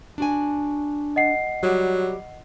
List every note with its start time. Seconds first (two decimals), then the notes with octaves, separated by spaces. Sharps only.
0.18 D4 F#4 G#5
1.16 D#5 F#5 C7
1.63 F#3 G3 G4